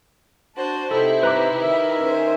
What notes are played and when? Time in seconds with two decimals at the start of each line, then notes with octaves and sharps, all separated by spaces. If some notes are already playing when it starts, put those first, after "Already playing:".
0.56 D4 F#4 C5 A5
0.91 C3 D#4 E4 G4 A4 C5
1.23 B4 A#5 D6
1.61 D#3 A#4 E5
2.01 C#4 G#4 C5